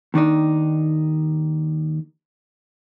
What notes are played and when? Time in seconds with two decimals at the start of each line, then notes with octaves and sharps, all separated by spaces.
0.14 D#2 D#3 D4 D#4